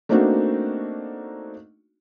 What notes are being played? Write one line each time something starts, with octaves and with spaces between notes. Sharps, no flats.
A3 A#3 C4 D4 D#4 F#4